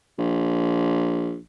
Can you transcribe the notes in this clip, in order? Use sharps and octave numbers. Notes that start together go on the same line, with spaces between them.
A#1